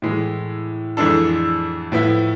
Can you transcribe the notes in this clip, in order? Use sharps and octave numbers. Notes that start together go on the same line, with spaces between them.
A2 E3 G#3
F2 E3 G#3 D4 A4
A2 F3 B3 E4